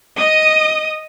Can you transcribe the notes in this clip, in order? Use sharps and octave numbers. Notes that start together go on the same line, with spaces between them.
D#5 D#6